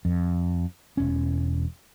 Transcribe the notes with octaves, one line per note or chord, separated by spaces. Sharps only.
F2
E1 C#4